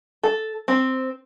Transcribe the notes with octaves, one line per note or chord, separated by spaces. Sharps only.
A4
C4